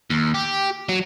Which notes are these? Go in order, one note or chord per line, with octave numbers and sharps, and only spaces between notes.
D#2
G4
F#3